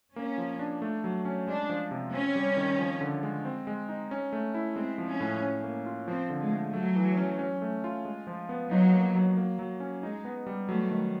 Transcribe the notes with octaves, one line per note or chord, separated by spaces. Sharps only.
A#3 C#4
F3
D4
A3
F#3
C#4
G#3 D4
F3
C3
C4 C#4
G3
D#3
F3
D3
G#3
C4
G#3
D#4
C#4
A3
E4
G#3 C4
F3
C#4
A2
C#4
A#3
F4
F3 C4
D3
G#3
A3
F#3 A3
E3
C#4
C#4
A3
F4
G#3
F3
B3
F#3 D#4
A#3
F#3
A#3
F#3
C#4
G#3 D#4
B3
G3
F#3 A3
D#3